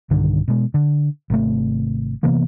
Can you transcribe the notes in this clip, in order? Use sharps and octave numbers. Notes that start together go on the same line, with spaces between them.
B1 G2 D3 D#3
B2 G#3
D3
G#1 C3 A3
C3 E3 A#3 B3